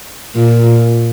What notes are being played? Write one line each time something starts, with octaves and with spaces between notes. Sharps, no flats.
A#2